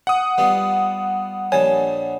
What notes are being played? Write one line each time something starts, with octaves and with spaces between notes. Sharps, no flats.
F#5 D#6
G3 B3 F4
A#1 G3 C#5 G#5 A5